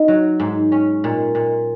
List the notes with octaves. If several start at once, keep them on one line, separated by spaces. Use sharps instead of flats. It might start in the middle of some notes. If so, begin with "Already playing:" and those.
Already playing: D#4
F#3
G#2
C#4
A#2
A#2